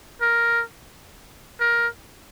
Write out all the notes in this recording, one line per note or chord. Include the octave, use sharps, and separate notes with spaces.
A#4
A#4